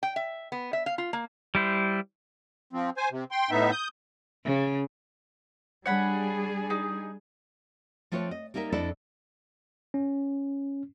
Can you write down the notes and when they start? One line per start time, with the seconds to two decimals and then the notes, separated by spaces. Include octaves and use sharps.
0.03 G5
0.16 E5
0.52 B3
0.73 E5
0.86 F5
0.98 F4
1.13 A#3
1.55 G3 E4 C5
2.73 F3 C4
2.97 C5 G#5
3.11 C3
3.31 G5 C6
3.51 A2 B3 D#4 E5
3.71 D#6 G6
4.45 C#3
5.86 G3 D4 G#4 C#5 F#5 B5
6.70 D#4
8.12 F3 A3 C4 F4 B4 C#5
8.31 D#5
8.54 G3 A#3 D#4 A#4 E5
8.72 F2 D4 E4 A4 D5 D#5
9.94 C#4